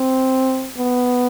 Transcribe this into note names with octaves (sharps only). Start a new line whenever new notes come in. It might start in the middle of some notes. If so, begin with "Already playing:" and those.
Already playing: C4
B3